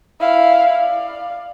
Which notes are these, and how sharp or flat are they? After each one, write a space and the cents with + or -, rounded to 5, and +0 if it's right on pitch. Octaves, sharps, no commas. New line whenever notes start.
E4 +0 F5 +0
D5 +25 F5 +0